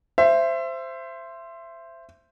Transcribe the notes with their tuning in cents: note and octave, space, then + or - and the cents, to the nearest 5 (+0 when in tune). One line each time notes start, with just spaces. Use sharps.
C5 +0 E5 +25